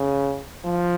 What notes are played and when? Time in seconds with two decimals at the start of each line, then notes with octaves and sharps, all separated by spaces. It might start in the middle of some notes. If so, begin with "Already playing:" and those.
Already playing: C#3
0.65 F3